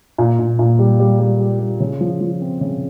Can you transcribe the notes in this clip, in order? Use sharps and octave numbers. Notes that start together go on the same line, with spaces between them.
A#2
A#2
A#2
G3
G3
G3
G3
G3
C#3
F3
F3
C4
C#3